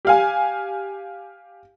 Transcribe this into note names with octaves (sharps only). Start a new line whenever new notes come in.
G4 F5 G#5